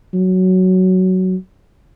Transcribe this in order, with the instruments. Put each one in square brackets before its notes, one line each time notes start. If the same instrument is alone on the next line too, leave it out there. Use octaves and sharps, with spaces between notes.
[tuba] F#3